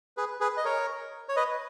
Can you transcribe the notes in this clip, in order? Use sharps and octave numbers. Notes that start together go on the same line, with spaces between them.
G#4 B4
G#4 B4
D#5
A#4 C#5
C#5
B4 D#5